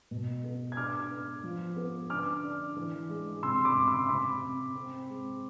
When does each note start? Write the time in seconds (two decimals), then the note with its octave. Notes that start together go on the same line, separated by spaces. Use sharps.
0.11 B2
0.44 B3
0.72 G#6
0.77 D4 D6 F6
1.10 B3
1.43 F3
1.76 B3
2.10 D3 D6 F6
2.44 D4
2.76 E3
3.09 G#3
3.43 C3 C6 E6
3.65 B5 D6
3.76 C3
3.88 C6 E6
4.09 C3 B5 D6
4.42 C3
4.75 C4
5.09 G#3